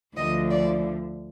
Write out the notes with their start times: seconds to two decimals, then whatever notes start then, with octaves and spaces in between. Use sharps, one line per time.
0.16 D2 D3 F3 D#5
0.50 D5